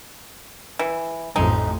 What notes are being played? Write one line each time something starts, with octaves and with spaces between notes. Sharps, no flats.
E3
A1 F2 A2 G#3 D#4